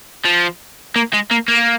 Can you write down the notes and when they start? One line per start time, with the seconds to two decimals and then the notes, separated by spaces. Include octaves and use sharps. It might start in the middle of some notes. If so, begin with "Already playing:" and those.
0.25 F3
0.96 A#3
1.13 G#3
1.31 A#3
1.48 A#3